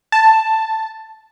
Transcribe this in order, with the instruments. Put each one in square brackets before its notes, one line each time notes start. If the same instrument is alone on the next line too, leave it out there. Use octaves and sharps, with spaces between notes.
[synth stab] A5